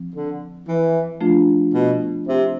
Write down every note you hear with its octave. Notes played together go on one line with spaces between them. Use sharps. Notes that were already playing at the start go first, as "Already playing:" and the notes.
Already playing: F3 C4
D3
E3
F3 A3 D4 F4
B2
C3